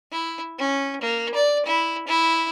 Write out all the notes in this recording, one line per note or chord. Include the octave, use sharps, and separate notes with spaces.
E4
C#4
A#3
D5
E4
E4